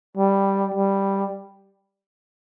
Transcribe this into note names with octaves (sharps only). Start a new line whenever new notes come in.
G3
G3